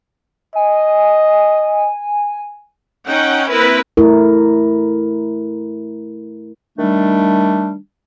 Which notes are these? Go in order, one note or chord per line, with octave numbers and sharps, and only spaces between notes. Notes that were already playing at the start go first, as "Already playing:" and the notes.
D#5 G#5
C#4 D#4 F#5 G5
A#3 C4 E4 A#4 B4
A3 E4 A#4
D#3 G3 A3 D4